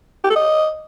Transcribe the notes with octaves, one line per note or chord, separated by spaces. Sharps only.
G4
A4
D#5